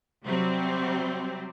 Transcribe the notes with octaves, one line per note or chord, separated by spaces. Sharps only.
C3 F#3 G3 C4